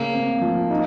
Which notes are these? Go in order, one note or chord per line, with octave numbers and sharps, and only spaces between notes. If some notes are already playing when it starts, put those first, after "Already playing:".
Already playing: C#3 A#3
C4
F3
D#4